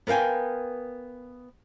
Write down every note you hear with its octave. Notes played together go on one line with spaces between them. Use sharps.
B3 A#4 F5 G5 G#5